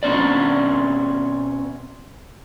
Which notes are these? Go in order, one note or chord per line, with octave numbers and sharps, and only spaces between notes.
B2 C4 C#4 D5